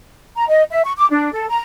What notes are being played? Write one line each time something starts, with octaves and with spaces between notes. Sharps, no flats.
A#5
D#5
E5
C#6
D6
D4
A4
A#5